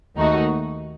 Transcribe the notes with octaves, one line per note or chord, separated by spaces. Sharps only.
D#2 D#3 A3 D#4 F#4